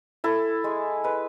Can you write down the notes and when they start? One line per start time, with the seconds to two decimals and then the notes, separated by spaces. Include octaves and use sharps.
0.24 E4 A4
0.64 G#3
1.04 G#3 B4